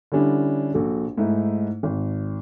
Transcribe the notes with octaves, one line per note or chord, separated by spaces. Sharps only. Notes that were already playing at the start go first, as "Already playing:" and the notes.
D3 G3 C#4 D4 E4
A#1 F#4 A4
G#2 A3 D#4 E4
G#1